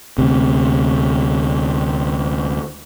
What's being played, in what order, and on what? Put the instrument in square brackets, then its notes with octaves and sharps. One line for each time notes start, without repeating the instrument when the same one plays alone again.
[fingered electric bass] D2 C3